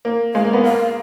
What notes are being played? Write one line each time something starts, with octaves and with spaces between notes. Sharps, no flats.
A#3
G#3 F5
A#3
B3
A#3 F5